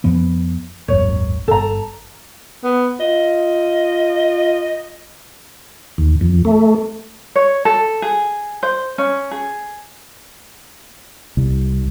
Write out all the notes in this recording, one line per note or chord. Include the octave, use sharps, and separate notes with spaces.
F2 F3 B3
D#1 G#1 F#2 C#5
D1 G1 A4 A#5
B3
F4 D#5
D#2
F2
A3
C#5
A4
G#4
C5
C#4
G#4
C2